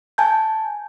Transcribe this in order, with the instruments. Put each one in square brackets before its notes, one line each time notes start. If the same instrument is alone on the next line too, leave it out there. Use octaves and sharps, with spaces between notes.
[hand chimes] G#5 A5 G6